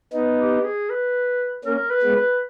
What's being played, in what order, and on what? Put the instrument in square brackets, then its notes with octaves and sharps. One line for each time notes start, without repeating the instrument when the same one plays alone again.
[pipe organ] B3 D#4
[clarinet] G4
G#4
B4
[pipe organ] A#3 C#4 [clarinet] A#4
[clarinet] B4
[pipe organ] G#3 B3
[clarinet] B4